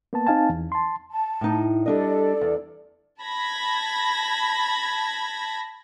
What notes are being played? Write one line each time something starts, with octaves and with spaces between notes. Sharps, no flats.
A#3 B3 A5
C4 D#4 F5 G#5 A5
E2
A5 C6
A5
A2 D#4
G3 D4 A4 D5 D#5
E2
A5 B5 G#6 A#6